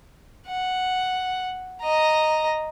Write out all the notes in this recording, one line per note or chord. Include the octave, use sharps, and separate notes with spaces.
F#5
D#5 A#5